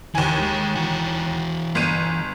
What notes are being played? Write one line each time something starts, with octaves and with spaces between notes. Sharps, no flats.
D#2 D#3 E3 G#5
G#3
E3 F#4
G1 D#7